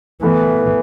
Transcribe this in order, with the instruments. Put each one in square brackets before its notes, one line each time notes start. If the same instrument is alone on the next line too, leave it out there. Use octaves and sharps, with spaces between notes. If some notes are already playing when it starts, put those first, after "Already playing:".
[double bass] E3 [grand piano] A3 B3